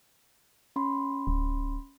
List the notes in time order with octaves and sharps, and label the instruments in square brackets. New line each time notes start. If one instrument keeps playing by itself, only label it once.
[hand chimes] C#4 B5 C6
[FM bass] D1